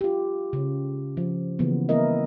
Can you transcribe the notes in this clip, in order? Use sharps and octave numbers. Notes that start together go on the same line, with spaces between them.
F4 G4
C#3
F3
C#3 E3 F#3 A#3 B3
G3 A#3 B3 E4 A#4 D#5